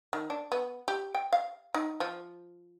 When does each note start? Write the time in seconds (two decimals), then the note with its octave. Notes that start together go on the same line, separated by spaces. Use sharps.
0.13 D#3
0.30 D4
0.52 B3
0.88 G4
1.15 G5
1.33 F5
1.74 D#4
2.00 F3